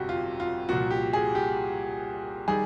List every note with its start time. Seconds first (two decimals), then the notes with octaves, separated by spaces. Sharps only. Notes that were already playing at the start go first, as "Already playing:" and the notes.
Already playing: G1 F2 C3 F#4 G4
0.09 F4
0.40 F4
0.69 C2 A#2 F3 F#4
0.91 G4
1.13 G#4
1.35 G4
2.48 D#3 G3 G#4